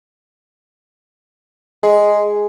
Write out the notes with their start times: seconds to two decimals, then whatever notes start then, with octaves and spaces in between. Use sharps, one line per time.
1.83 G#3 G#4